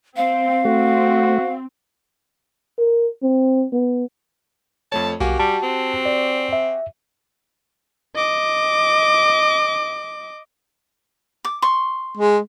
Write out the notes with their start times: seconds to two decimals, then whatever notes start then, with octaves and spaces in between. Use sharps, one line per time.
0.16 C4 F5
0.65 A3 C4 F#4
2.78 A#4
3.23 C4
3.73 B3
4.92 F2 A3 C#5 A5
5.20 B1 A#3 F#4 G4 G#5
5.39 G3 A5
5.63 C4
6.05 D5
6.53 E5
8.15 D#5 D6
11.45 D6
11.62 C6 C#6
12.17 G#3